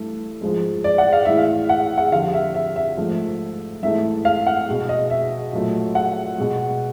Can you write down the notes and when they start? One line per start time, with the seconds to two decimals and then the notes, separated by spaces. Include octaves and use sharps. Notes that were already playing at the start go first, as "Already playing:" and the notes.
Already playing: G2 E3 A3
0.41 G#2 F3 G#3
0.84 D5
0.98 F#5
1.13 F5
1.25 A2 E3 G#3 E5
1.38 F5
1.69 F#5
1.98 F#5
2.12 F2 D3 G3 F5
2.33 E5
2.54 E5
2.76 E5
2.97 G#2 F3 A3
3.83 G#2 E3 A3 E5
4.25 F5
4.47 F#5
4.67 B2 G#3
4.89 D#5
5.10 E5
5.53 A#2 F#3 A3
5.95 F#5
6.38 B2 G#3